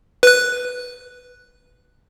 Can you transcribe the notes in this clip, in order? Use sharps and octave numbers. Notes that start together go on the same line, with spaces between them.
B4 F#6